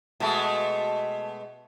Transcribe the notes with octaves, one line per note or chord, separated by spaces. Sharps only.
B2 G#3 A3